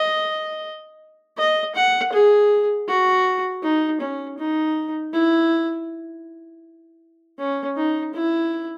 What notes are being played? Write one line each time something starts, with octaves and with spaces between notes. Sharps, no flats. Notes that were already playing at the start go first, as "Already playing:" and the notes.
Already playing: D#5
D#5
F#5
G#4
F#4
D#4
C#4
D#4
E4
C#4
D#4
E4